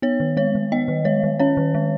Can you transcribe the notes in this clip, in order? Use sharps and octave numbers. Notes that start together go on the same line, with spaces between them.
B3 C#5
D#3
G#3 C#5
D#3
B3 D#5
D#3
G#3 C#5
D#3
C#4 C#5
D#3
G#3